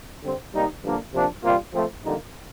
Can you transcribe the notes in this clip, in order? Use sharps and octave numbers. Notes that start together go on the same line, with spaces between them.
D3 G3 C4
C3 G3 A#3 D#4
G2 D3 F3 A#3 D4
C3 F3 A#3 D4
C3 G3 A#3 F4
F3 A3 C4
F2 D3 G3 A#3 D#4